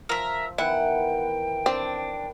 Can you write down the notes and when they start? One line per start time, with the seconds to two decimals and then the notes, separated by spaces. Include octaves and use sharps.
0.09 F3 A#4 E5
0.58 D#3 E3 B3 E4 F#5 G5
1.66 C4 D4